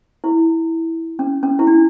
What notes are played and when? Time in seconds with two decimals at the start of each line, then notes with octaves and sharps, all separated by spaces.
0.24 E4
1.19 C#4
1.43 C#4
1.59 E4
1.67 D4